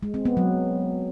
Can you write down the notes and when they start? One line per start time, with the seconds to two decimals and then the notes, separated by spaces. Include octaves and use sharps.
0.03 G#3
0.14 C4
0.25 B3
0.37 F#3